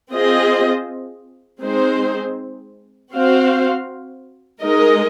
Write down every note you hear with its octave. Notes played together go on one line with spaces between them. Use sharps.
C4 F4 G#4 C5 D#5
G#3 C4 D#4 G#4 C5
C4 F#4 C5 F5
G#3 D#4 A#4 D#5